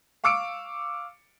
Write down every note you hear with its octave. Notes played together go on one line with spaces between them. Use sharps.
F5 C#6 D6 E6 C#7 D7